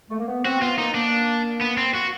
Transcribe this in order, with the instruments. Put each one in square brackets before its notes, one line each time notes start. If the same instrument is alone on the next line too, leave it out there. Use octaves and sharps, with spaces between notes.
[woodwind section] A3
A#3
B3
[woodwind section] C4 [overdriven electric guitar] F#4
[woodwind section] B3 [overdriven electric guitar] F4
[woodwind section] A#3 [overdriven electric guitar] D#4
[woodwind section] A#3 [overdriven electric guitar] D4
[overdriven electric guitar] B3
C4
F#4